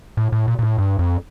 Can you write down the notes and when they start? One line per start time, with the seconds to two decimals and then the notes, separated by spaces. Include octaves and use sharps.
0.17 A2
0.32 A2
0.48 A#2
0.59 A#2
0.63 A2
0.78 G2
0.99 F2